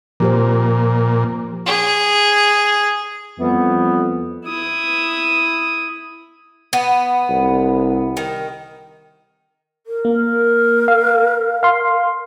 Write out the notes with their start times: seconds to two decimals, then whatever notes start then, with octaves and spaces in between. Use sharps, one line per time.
0.20 A#2 F3 G4 C5
1.66 G#4
3.39 F2 E3 G3 B3
4.46 E4 D#6
6.73 B3
7.29 C2
8.17 D#3
9.87 A#4
10.05 A#3
10.88 F5
11.63 F5 C6